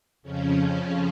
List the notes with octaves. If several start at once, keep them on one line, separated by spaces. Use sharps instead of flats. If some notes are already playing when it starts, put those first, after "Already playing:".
F2 C#3 F3 C#4
C#4